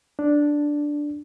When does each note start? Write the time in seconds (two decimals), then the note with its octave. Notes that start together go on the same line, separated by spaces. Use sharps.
0.19 D4